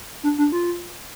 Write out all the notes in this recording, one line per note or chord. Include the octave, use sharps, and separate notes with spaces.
D4
D4
F4